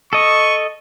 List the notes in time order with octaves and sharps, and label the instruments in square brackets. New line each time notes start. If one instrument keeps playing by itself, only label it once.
[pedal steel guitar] A4 D#5 [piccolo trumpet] C#6